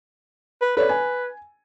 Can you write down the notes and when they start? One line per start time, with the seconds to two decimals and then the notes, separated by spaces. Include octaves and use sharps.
0.62 B4
0.77 A4 B4 C#5 D5
0.89 G#5